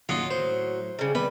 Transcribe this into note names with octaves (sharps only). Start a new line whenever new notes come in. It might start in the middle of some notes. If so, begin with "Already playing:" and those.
D1 D#2 C#3 F#3 F4 D#5 F5
A2 C5
C#3 G3
D#3 G3 B3 B4